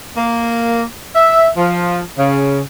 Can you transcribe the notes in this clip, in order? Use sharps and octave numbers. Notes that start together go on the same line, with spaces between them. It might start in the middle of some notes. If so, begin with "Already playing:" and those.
A#3
E5
F3
C#3